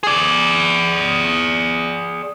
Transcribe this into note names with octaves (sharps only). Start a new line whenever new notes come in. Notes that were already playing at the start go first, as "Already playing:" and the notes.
G#4 D5